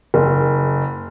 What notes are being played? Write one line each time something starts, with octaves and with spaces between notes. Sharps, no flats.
F#1